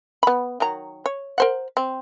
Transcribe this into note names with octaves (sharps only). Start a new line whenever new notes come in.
B3 B5
D#3 F#3 A#5
C#5
A#4 C5 F#5
C4